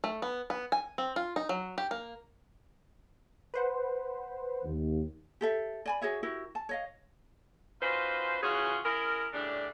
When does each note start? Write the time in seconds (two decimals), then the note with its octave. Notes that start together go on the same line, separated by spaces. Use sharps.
0.04 A3
0.22 B3
0.50 B3
0.72 G#5
0.98 C4
1.16 F4
1.36 D#4
1.49 F#3
1.78 G4
1.91 A#3
3.54 B4 C5 F#5
4.64 D#2
5.41 G4 A4 E5
5.86 D5 G#5 B5
6.02 F#4 G#4 C#5 E5
6.23 E4 F#4 G4 A#4
6.55 A5
6.69 C#5 D#5 F5
7.81 C#4 D#4 F4 F#4 B4 C5
8.42 C#3 E3 C#4 F4 F#4 G#4
8.84 C#4 E4 G#4 A#4
9.33 A2 C#3 G3 D4